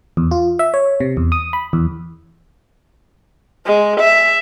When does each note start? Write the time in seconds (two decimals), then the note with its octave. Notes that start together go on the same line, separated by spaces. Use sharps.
0.17 E2
0.31 F4
0.59 E5
0.74 C#5
1.00 C3
1.17 E2
1.32 D#6
1.53 B5
1.73 E2
3.66 G#3
4.00 E5